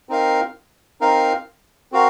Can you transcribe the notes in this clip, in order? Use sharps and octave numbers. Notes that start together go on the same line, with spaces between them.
C4 D#4 A#4 F5
C4 D#4 A#4 F5
C4 F#4 A#4 F5